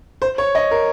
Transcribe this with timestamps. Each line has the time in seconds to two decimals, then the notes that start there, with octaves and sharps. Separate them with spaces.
0.22 C5
0.38 C#5
0.55 D#5
0.71 A#4